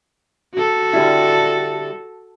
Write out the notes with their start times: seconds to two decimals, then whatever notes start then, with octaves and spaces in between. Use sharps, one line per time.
0.54 F#4 A4
0.93 D3 G3 E4